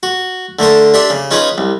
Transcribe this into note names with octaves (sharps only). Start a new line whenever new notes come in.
F#4
D3 A3 A#4 C6
D4 G4 E5 C6
C#3
C#4 D#4 F4 G#4 B4 C#5
C2